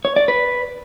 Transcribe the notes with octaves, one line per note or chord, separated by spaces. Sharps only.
C#5
D5
B4